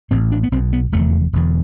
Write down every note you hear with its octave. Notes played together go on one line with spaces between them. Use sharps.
A1 A2 C4
D4
B3
B1 B2 C4
B3
F1 E2 D3 A3
E1 E2 D3